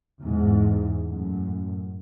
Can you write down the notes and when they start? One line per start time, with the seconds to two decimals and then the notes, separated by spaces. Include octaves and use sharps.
0.23 E2 G#2
1.07 F#2 A2